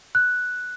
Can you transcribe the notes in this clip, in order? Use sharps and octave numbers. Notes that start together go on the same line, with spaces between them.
F#6